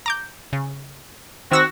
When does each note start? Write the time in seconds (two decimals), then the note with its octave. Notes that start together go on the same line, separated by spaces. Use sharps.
0.06 A#5 D6 G6
0.53 C#3
1.52 D#3 C4 F#4 E6 A#6